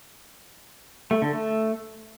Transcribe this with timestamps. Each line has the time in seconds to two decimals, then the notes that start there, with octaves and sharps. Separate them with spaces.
1.11 A3
1.22 D3
1.33 A3